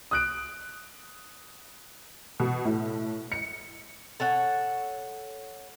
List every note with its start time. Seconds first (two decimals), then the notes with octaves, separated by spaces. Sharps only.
0.11 D#6 F#6 D7
2.40 B2
2.65 A2
3.32 C#7
4.20 A4 C#5 F#5 G#5